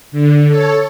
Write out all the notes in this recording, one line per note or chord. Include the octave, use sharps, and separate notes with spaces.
D3
A4 C#5